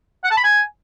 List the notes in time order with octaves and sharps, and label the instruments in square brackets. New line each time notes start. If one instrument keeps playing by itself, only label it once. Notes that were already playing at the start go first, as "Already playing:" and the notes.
[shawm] F#5
A5
B5
G#5